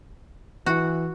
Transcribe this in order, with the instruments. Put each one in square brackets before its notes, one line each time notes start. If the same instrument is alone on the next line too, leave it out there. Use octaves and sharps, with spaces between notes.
[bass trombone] E3 [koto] F#4